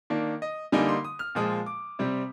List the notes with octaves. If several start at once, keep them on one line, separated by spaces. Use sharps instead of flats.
D#3 A#3 D4
D#5
D3 G3 A#3 D#4 G#5
C6
D#6
F6
A#2 F3 G#3 D#6
D6
C3 G3 C4